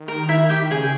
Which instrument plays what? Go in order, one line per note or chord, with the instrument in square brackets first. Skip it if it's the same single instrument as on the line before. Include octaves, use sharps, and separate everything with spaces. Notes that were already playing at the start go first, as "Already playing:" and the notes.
Already playing: [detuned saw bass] D#3
[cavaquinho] A#4
E4 E5
G4 G5
[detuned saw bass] C#3 [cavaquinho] G#4 G#5